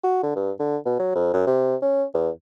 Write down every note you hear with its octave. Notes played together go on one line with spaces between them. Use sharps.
F#4
D3
G2
D3
B2
F#3
F2
F#2
C3
C#4
E2